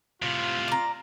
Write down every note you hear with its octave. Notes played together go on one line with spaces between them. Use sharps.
A2 C3 F4
D5 A#5